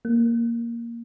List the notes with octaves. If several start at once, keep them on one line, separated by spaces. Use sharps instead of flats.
A#3